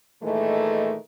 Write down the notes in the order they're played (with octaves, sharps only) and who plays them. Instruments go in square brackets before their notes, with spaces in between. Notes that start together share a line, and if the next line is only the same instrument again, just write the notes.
[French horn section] A#2 D#3 E3 G#3 A3